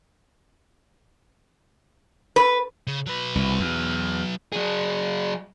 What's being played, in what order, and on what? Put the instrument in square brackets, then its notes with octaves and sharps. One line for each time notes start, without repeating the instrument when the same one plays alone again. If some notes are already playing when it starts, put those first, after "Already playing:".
[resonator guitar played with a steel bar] B4
[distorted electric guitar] C#3
F#3 B4
[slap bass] C2
E2
[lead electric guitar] F#3 G#4